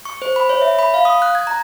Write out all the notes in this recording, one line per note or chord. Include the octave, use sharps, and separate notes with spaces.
C#6
C5
B5
C#5
E5
B5
F5
D#6
F#6
G#6
A#5